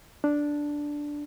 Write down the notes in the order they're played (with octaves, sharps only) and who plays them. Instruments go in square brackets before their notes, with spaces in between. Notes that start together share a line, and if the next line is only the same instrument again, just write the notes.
[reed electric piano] D4